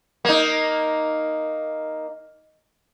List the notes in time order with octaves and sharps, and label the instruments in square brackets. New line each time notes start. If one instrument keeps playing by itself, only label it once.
[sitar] A#3 D#4